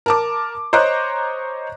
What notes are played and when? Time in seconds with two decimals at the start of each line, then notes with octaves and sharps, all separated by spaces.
0.06 A#4 A5 D6
0.73 C5 C#5 D#5 A#5 D6 F#6